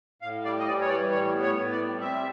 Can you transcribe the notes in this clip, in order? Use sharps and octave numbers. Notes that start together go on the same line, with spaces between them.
A2 F5
G3 D5
D#5
E3 D5
C#5
G3 D5
A2 C#5
B3
C#5
A2
D5
G3
C4 E5